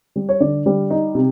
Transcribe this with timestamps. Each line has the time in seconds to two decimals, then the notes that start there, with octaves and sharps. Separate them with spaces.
0.16 G3
0.29 C#5
0.40 D3 D5
0.66 G3
0.90 D#4
1.15 C3